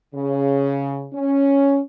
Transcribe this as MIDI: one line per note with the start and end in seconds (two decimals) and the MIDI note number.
0.15 1.08 49
1.13 1.80 61